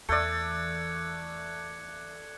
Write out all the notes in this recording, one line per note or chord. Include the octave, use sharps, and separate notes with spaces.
E2 E3 A3 D5 F#6 G#6 C#7